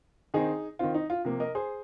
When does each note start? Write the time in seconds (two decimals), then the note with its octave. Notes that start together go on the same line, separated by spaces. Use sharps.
0.34 D#3 C4 D#4 G#4
0.79 D#3 C4 F4
0.94 D#4
1.10 F4
1.25 C3 F3 A#3
1.40 A#4 D#5
1.55 G#4 C5